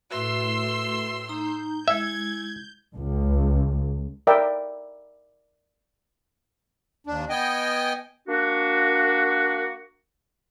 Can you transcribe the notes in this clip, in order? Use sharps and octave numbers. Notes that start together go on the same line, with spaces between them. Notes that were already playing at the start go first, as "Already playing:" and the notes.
A2 A3 F#4 B4 E5 C6 E6
D#4 A#5 G6
G#3 E4 E5 G#6
C#2
A#4 D5 E5 G5
D#2 D4
B3 D#5 G5 G#5
A#3 D4 F#4